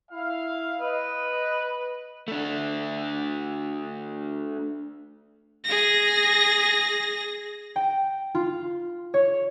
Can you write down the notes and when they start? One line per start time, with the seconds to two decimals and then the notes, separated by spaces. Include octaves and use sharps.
0.12 E4 F5
0.81 B4 D#5
2.28 A3 D4
5.65 G#4 A#6
7.76 G5
8.35 F4
9.14 C#5